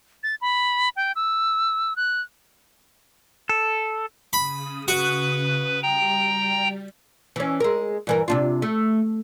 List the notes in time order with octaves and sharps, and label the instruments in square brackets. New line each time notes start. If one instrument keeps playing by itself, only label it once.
[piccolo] A6
B5
G5
E6
F#6
[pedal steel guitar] A4
[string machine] C#3 D#6 [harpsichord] B5
[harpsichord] F#4 [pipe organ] B4
[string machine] G3 [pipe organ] G5 A#5
[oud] E3 C#4
G#3 A#4
G2 E3 A#4
C3 D4 F4
A3